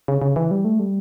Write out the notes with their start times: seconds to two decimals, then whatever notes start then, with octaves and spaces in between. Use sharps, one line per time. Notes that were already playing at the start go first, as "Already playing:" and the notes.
0.08 C#3
0.22 C#3
0.36 E3
0.51 G3
0.65 A3
0.79 G3